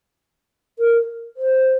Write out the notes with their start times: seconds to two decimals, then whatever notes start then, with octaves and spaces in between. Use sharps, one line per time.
0.79 A#4
1.37 C5